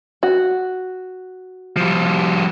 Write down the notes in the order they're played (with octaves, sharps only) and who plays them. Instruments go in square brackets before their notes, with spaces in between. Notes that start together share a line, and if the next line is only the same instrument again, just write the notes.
[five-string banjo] F#4
[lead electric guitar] F3 G3